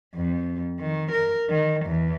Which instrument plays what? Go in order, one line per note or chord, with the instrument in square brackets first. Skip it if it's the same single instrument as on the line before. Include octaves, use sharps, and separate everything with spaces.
[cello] F2
D#3
A#4
D#3
E2